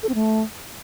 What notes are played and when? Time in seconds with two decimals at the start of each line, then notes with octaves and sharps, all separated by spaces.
0.03 A4
0.09 C4
0.15 A3